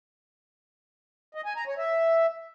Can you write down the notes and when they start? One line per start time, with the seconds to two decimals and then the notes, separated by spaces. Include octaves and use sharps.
1.35 D#5
1.46 G#5
1.56 A#5
1.67 C#5
1.78 E5